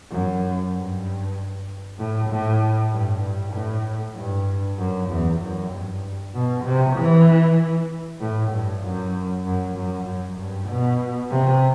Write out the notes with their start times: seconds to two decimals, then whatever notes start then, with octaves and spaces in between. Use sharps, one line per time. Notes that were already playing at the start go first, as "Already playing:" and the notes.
0.11 F#2
0.73 G2
1.98 A2
2.30 A2
2.92 G2
3.23 G2
3.54 A2
4.16 G2
4.79 F#2
5.10 E2
5.41 F#2
5.71 G2
6.35 B2
6.65 C3
6.96 E3
8.21 A2
8.52 G2
8.82 F#2
9.46 F#2
9.77 F#2
10.07 F#2
10.39 G2
10.69 B2
11.31 C3